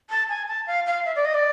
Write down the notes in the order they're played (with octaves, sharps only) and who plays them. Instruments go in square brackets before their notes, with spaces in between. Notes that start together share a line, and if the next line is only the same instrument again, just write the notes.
[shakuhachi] A5
G#5
A5
F5
F5
E5
D5
D#5
D5